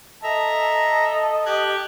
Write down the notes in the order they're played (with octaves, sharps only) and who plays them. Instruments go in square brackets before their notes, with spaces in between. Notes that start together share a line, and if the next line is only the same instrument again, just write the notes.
[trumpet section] A4 D#5 A5 [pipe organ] E5 A#5
[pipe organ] G4 F#6 G#6